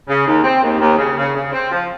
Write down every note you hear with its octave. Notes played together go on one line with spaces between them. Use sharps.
C#3
D#2
C4
D#2
D#2
C#3
C#3
C#3
C4
F3